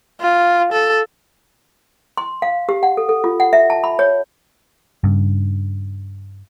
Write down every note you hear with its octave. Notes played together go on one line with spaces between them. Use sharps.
F4
A4
C6
F5
G4
F#5
A4
A4
F4
F#5
E5
A5
B5
C#5
G2 C#3